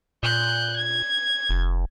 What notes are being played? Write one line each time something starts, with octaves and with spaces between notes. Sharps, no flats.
A#2 F#6 G6
G#6
F1